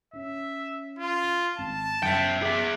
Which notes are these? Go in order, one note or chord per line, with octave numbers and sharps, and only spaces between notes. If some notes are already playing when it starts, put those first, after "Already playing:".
C#4 E5
F4
G#1 A5
F#1 E5 G5 C#7
G#4 E5 D6